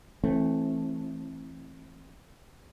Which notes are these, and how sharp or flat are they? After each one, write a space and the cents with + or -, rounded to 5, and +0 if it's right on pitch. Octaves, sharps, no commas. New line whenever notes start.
E3 +0 A3 +0 C4 +30